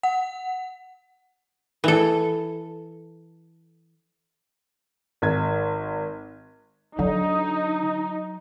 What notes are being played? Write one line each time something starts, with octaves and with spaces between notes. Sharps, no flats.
F#5
E3 A4
G#1 G#6
D3 F#3 D#4